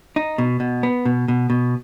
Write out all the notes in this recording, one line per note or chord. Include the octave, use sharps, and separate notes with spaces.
D#4
B2
B2
B3
B2
B2
B2